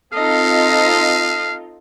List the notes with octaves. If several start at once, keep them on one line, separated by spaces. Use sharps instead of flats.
C4 D#4 F4 A4 D#5 F5